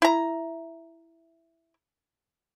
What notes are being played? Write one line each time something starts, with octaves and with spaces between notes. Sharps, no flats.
E4 A#5